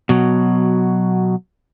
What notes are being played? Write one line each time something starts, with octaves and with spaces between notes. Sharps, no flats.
B2 F#3